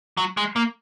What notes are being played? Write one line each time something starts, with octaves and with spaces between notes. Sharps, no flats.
F#3
G#3
A#3